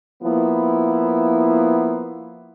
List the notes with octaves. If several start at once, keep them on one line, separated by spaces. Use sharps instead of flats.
F3 A#3 B3 E4